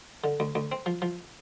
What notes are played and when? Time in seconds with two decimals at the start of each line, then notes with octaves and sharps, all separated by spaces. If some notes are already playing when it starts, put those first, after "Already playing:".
0.24 D3
0.40 D2
0.55 D2
0.72 C4
0.86 F3
1.02 F3